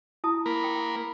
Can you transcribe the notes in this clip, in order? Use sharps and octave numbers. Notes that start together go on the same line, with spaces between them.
E4 A5 D#6
A#3 A#4 B5
G5